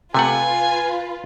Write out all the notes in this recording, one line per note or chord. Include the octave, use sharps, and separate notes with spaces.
C3 A3 F4 B4 F#5 G#5